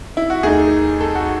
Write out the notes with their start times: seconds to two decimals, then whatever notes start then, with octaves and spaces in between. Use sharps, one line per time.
0.17 E4
0.30 F#4
0.43 D#2 D#3 A3 D#4 G#4
1.01 A4
1.15 F#4